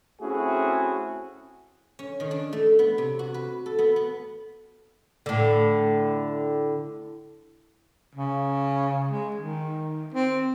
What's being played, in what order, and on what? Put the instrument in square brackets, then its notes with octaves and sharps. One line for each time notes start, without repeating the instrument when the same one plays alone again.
[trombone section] A3 C4 C#4 E4 F#4 G#4
[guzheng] C#4
D#3
D4
A3
B3
C3
F#4
B4
A4
B3
B3
[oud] A2 D3
[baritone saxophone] C#3
G#3
D#3
C4